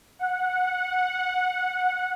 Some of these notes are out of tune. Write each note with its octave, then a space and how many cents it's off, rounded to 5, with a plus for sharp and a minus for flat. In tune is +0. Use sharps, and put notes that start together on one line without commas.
F#5 -15